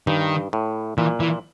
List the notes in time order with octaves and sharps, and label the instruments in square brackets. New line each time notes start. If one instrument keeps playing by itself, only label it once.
[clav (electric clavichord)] G2 [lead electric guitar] D#3
[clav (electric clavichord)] A2
[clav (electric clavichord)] A#2 [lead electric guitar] E3
[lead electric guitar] E3